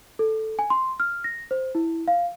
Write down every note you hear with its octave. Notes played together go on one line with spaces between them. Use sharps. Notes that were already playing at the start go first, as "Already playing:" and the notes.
A4
G#5
C6
F6
A#6
C5
E4
F5